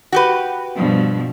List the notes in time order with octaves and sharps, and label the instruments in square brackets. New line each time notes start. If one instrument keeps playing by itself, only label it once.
[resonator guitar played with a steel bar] F#4 G4 B4
[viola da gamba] G2 B2 F3